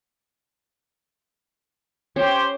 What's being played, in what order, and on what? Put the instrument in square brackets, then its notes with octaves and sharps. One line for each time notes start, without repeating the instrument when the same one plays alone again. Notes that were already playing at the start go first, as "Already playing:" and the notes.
[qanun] C#4 [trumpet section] G4 C5